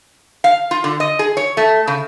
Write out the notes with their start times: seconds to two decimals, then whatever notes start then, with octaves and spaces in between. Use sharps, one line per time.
0.44 F5
0.71 F4
0.84 D3
1.00 D#5
1.19 G#4
1.37 C#5
1.57 A3
1.87 C#3